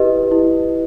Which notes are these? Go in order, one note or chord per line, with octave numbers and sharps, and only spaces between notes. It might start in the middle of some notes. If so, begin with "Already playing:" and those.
Already playing: E4 G4 B4 D#5
E4